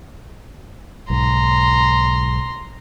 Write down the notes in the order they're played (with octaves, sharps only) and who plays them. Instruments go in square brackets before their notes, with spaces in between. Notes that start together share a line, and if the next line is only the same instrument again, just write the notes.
[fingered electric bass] B1 G#2 [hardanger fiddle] A#5 C6